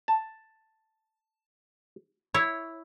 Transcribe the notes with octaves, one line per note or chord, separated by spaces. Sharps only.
A5
E4 C#5